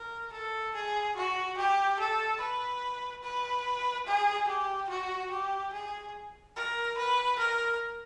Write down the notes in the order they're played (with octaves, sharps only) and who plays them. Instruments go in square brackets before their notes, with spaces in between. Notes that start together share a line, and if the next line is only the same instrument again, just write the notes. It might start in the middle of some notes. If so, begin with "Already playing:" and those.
Already playing: [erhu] A#4
A4
G#4
F#4
G4
A4
B4
B4
G#4
G4
F#4
G4
G#4
A#4
B4
A#4